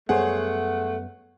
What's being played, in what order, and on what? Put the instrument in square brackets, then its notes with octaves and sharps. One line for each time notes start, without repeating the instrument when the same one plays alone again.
[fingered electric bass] F#2 G3 B3 [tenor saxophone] A3 [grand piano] G#4 C5 C#5 [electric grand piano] F#5